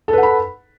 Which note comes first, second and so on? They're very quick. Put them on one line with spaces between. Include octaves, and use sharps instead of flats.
A4 B4 F#5 B5